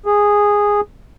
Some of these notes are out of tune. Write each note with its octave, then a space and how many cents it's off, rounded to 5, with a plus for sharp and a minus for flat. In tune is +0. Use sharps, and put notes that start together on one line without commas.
G#4 -10